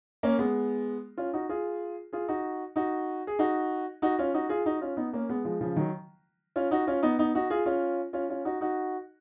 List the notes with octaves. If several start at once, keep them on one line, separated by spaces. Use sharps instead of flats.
A#3 C#4
G#3 B3
C#4 F4
D#4 F#4
F4 G#4
F4 G#4
D#4 F#4
D#4 F#4
G#4
D#4 F#4
D#4 F#4
C#4 F4
D#4 F#4
F4 G#4
D#4 F#4
C#4 F4
B3 D#4
A#3 C#4
G#3 B3
F3 G#3
C#3 F3
D#3 F#3
C#4 F4
D#4 F#4
C#4 F4
B3 D#4
B3 D#4
D#4 F#4
F4 G#4
C#4 F4
C#4 F4
C#4 F4
D#4 F#4
D#4 F#4